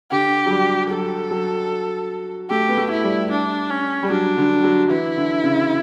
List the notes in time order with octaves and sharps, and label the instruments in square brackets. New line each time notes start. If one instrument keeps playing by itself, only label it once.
[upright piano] D3 [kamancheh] G4
[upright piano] F#3
G3
[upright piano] F#3 [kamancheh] A4
[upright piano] F#3
[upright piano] A3 [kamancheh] G4
[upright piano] B3
A3
[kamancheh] E4
[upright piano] G3
[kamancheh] D4
C#4
[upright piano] G3
[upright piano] F#3 [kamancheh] D4
[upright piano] D3
F#3
[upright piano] E3 [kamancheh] E4
[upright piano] D3
C#3